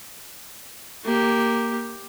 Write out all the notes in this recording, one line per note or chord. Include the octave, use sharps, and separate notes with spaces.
A#3 G4